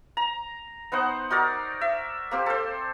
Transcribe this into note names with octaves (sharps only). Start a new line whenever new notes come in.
A#5
B3 D#4 C5 F#5
D#4 F#4 A#4 D5
E5
A#3 C4 G4
A4 C5